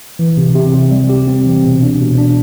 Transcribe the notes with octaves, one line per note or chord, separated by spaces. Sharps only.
E3
C3
C3
C3
G3
G4
C4
E3
B2
D4
B2
D4